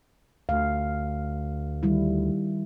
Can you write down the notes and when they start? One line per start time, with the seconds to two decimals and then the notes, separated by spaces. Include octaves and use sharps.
0.49 D2 F5
1.83 D#3 G3 E4